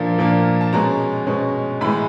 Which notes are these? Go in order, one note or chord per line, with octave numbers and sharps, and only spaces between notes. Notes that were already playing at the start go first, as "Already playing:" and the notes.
Already playing: A#2 F3 A#3 D4
A#2 F3 A#3 D4
A5
B2 G#3 C#4 A#5
B2 G#3 C#4
A2 E3 G#3 B5